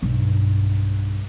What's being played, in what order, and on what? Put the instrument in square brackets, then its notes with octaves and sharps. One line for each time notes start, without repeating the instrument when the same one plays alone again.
[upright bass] B1 G2